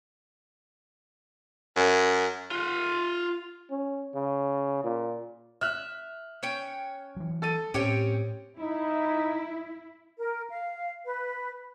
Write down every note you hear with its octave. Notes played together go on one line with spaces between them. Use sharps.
F#2
F4 F#5
C#4
C#3
A#2
E5 F6 F#6
C#4 C#5 G5
E3 F#3
A4 A6 D#7
A2 C4 C#4 G4 C#5 G5
D#4 E4
A#4
F5
B4